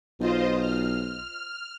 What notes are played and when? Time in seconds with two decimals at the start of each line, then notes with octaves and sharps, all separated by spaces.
0.20 B1 F4 C5 D#5
0.60 F6